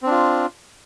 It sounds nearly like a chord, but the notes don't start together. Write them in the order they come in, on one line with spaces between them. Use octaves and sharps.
C4 D4 F4